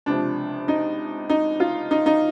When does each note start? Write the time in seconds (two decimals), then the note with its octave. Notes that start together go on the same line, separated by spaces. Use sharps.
0.06 C#2 C3 F3 D4
0.68 D#4
1.29 D#4
1.60 F4
1.91 D#4
2.06 D#4